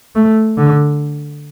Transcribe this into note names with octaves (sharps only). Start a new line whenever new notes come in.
A3
D3